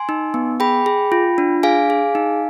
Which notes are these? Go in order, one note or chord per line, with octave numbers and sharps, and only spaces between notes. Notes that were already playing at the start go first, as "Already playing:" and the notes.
Already playing: G#5 C6
D#4
B3
G#4 G5 B5
G#4
F4
D4
G#4 F5 G#5
G#4
D#4